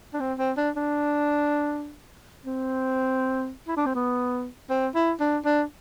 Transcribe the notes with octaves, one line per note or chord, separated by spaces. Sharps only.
D4
C4
C4
D4
D4
C4
E4
D4
C4
B3
C4
E4
D4
D4